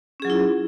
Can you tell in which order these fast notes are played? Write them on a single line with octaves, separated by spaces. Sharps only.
C#4 G#4 F#3 F4 E4